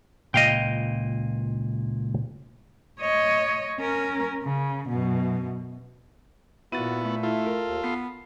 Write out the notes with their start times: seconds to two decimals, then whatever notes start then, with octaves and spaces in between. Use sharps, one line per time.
0.34 C#2 A#2 D#5 F5 G5
3.01 C#5 D#5
3.79 C#4 A#4
4.44 C#3
4.89 F#2 B2
6.72 A#2 B3 E4 F#4 A6 D#7
7.04 A3
7.23 E4 F4 A4
7.46 A#4
7.68 D#2
7.84 B3 C7